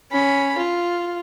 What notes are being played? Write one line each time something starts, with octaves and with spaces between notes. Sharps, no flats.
C#4 B5
F4